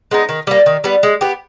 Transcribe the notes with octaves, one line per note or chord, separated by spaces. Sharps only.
G#3 B3 D#4
D#3
G3 A#3
D#3
G3 B3
G#3
B3 G4